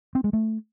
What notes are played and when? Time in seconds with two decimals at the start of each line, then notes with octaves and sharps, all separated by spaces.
0.15 C4
0.24 G#3
0.33 A3